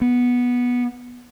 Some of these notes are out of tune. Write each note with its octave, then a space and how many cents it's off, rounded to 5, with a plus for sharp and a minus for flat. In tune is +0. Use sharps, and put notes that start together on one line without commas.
B3 -10